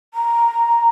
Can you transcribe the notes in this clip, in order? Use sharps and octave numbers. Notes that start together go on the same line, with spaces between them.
A#5